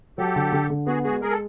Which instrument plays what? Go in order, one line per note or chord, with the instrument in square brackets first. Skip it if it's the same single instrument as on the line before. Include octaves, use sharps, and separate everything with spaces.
[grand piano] F#3 [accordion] G4 A4
[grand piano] D3
D3
D3
[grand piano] B3 [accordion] F#4 G#4
[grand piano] G#3 [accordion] F#4 G#4
[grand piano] G#3 [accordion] G#4 A#4
[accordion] A4